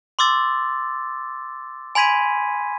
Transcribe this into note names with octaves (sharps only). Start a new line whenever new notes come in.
C6 D6 E6 A6
G#5 B5 C6 G#6 B6 D#7